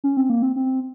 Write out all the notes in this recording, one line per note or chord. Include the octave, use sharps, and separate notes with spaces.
C#4
C4
A#3
C4
C4